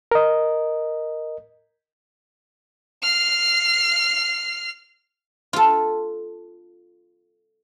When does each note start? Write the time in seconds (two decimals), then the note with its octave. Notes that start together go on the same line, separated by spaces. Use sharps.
0.11 A#4 D#5
3.02 F6 C7
5.53 F4 A4